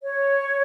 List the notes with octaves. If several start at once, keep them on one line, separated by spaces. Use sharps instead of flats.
C#5